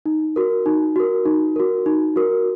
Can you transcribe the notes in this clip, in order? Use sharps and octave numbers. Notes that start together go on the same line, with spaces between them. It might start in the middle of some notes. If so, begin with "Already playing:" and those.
D#4
F#4 A#4
D#4
F#4 A#4
D#4
F#4 A#4
D#4
F#4 A#4